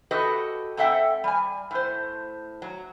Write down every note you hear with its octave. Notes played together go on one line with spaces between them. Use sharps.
F#4 G4 A4 B4 D#5
G#2 C4 A4 E5 F#5 G5
G3 G#5
A2 C5
F#3